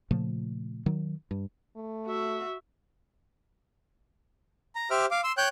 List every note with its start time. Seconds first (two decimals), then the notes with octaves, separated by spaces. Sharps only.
0.11 A#2 C#3 F3 A3
0.86 D#3 F#3
1.31 G2
1.76 A3
2.06 F#4 E5
4.75 A#5
4.91 G4 C5 E5 D6 F6
5.11 F5 D6
5.24 C6 E6
5.37 C#5 G5 F#6 G6